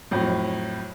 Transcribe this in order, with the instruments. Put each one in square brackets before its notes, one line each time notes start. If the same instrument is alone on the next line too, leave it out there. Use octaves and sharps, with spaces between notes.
[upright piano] F2 A2 F#3